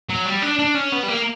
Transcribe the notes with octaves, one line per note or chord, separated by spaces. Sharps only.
F#3
G3
D4
D4
C#4
B3
G3
A#3